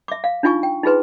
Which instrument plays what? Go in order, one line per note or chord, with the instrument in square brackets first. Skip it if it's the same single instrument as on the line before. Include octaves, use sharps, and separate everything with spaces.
[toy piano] E5 D6
F5
D4 D#4 F4 G#5 C#6
G5
D#4 F4 G#4 B4 C6